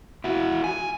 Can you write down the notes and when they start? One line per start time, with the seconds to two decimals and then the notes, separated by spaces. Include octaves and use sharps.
0.24 E4 F#4
0.64 G#5